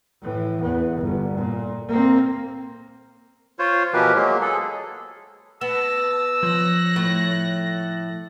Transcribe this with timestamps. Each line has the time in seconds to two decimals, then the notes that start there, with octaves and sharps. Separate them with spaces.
0.22 A2 E3
0.61 E2 B3
0.97 G1
1.37 A#2
1.88 A#3 C4
3.59 F4 C5 C#5
3.93 B2 E3 F3 G4 A#4 B4
4.15 F#3 G#3 A#3
4.41 G#4 A4
5.61 B3 A5 E6 A#6
6.43 F3 C#5 F#6 A#6
6.96 A2 A4